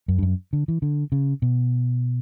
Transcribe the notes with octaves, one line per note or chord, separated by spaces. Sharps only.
F#2
G2
F#2
D3
E3
D3
C#3
B2